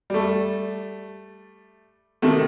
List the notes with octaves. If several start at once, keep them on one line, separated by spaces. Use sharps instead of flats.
G3 A3
C3 D#3 A3